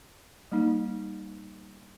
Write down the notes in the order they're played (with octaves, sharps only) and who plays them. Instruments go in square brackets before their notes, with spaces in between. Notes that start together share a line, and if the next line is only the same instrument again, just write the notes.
[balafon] G3 A#3 D#4